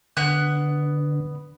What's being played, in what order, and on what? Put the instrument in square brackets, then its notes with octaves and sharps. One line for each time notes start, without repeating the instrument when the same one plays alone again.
[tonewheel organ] D3 [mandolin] B3 F#6